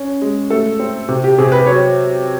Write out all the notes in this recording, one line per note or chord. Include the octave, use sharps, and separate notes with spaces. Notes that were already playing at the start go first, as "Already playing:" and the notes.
Already playing: C#4
G#3
A3 A4
C4
C3
G4
C3 G#4
B4
F#3 C#5